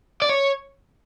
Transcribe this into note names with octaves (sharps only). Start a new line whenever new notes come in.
D5
C#5